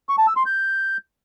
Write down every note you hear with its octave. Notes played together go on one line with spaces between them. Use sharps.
C#6
A5
E6
C6
G6